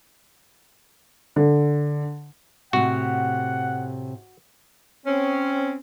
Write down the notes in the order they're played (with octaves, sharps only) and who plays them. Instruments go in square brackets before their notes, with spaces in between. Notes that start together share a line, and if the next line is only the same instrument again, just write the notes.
[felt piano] D3
[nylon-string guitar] A2 C3 [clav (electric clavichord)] F#4 [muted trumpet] F#5
[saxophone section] C4 C#4